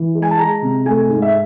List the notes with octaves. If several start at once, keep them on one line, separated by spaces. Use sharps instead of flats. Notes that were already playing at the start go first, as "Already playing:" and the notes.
Already playing: E3
G#3
G#5
A5
G#3 A#5
C3
A3 G#5
G#2
E5